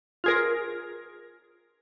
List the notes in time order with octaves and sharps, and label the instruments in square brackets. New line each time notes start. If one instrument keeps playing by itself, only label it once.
[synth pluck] F4 G#4 A#4